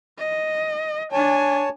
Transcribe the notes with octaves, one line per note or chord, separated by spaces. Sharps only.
D#5
D4 C#5 G#5 A5